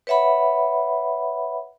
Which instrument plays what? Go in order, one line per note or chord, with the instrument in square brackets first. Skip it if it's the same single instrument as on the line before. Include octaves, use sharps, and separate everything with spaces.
[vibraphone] B4 C#5 E5 F#5 B5